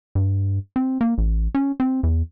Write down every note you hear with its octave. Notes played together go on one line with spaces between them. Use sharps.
G2
C4
A#3
A1
C#4
C4
E2